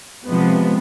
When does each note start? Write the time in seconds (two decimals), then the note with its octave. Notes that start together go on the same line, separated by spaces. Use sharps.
0.25 C3 F3 G#3 B3